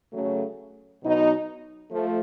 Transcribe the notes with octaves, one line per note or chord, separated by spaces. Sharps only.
C#3 F#3 A3
B2 F#3 B3 D#4
F3 A3